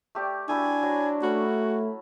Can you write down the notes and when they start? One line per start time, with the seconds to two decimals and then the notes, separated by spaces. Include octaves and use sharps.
0.15 A3 G4 D5
0.49 D4 E4 F#4 A4 G#5
0.82 F#3
1.23 A3 C#4 F#4 B5